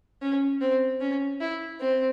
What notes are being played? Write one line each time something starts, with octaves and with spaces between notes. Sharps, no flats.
C#4
C4
C#4
E4
C4